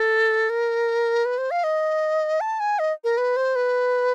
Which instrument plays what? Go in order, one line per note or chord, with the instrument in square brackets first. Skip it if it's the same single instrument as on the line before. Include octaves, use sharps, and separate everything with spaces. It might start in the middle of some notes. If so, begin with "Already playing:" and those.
Already playing: [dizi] A4
A#4
B4
C5
F5
D#5
A5
G#5
D#5
A#4
B4
C5
B4